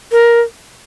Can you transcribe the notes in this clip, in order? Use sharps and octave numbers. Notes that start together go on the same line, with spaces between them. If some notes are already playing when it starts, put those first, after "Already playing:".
A#4